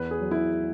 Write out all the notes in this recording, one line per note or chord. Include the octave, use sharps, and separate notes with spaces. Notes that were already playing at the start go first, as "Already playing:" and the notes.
Already playing: E2 B4
G#4
F#3
E4